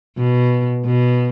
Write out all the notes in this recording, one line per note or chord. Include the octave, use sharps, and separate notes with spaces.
B2
B2